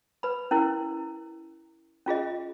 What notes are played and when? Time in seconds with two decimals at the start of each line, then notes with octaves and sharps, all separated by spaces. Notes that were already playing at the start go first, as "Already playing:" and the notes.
0.23 B4 B5
0.51 C#4 E4 A#4
2.06 C#4 F4 G#4 D#5